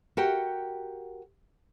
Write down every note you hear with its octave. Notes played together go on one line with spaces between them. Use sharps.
F#4 G4 A#4 F#5 G5